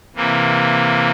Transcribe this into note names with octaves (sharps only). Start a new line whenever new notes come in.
C3 E3 A#3